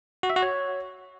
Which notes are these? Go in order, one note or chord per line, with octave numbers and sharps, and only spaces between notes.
F#4
E5
F#4
C#5